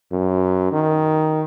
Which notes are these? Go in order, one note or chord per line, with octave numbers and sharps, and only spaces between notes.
F#2
D#3